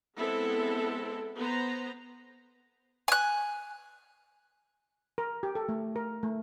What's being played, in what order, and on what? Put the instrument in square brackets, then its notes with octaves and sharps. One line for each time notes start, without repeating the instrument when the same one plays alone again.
[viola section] G#3 B3 C4 E4 A4
B3 B4 C5 A#5
[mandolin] G#5 F#6
[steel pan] A#4
G4
A4
A3
A#4
A3